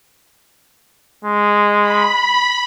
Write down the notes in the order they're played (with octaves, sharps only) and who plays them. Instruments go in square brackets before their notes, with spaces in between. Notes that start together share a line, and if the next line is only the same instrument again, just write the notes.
[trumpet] G#3
[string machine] B5